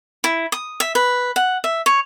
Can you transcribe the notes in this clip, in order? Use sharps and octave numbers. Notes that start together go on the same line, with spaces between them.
E4
D#6
E5
B4
F#5
E5
C#5